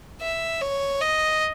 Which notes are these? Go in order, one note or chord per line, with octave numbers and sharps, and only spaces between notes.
E5
C#5
D#5